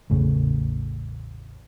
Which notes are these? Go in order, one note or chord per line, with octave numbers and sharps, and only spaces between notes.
A1 E2 C#3 A3